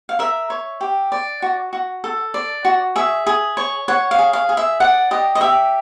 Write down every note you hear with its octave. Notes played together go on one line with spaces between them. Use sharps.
F5
A#4 E5
C#5
G4
D5
F#4
F#4
A4
D5
F#4
G#4 E5
G#4
C#5
C#5 F#5
F5
G#4
F5
G#4
E5
D5 F#5
G4 D#5
D#5
G4 E5